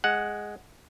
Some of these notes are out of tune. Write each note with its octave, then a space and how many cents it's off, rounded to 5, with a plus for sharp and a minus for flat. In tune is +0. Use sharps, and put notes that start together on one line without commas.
G#3 +0 F#5 +0